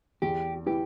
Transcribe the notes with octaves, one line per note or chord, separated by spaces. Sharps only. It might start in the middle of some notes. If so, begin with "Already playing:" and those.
E2 G4
E3 G4